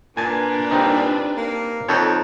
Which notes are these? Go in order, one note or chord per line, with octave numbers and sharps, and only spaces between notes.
A#2 D4 B4 G#5 A5
G3 C4 D#4
A#3
F2 D#4 A4 C#5